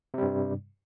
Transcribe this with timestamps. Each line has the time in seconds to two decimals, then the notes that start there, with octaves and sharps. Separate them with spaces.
0.14 C3
0.18 G3
0.22 G2